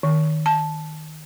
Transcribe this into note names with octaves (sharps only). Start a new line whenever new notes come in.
D#3
A5